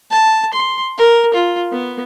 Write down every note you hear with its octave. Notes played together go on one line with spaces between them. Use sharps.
A5
C6
A#4
F4
B3